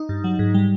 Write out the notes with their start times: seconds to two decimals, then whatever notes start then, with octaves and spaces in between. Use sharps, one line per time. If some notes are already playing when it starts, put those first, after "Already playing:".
Already playing: D#4
0.09 G2
0.24 F#3
0.39 G#2
0.54 G3